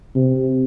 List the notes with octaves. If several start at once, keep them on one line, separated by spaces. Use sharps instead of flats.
C3